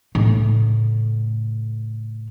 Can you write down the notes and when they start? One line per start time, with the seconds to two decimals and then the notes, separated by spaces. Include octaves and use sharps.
0.15 A2 C#3